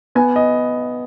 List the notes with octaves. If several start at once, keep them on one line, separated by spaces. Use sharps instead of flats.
B3 G#5
D#5